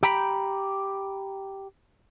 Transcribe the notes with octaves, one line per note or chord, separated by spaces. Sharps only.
G4 G5 A#5 B5